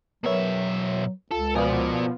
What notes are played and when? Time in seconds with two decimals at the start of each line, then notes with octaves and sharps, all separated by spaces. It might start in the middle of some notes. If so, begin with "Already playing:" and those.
0.24 B2 F#3 A#4 B4 C#5 E5
1.31 C#2 F4 A4
1.55 B2 F3 A#4 D5 G#5 D#6